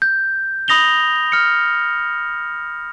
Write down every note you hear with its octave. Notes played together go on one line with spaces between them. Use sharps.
G6
B5 D#6 A#6 F7 G7
F6 C#7